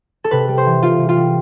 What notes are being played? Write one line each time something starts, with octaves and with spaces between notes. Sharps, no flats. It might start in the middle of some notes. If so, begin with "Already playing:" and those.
A4
C3 B4
G3
C5
E3
C3 F4
C3
F4
G3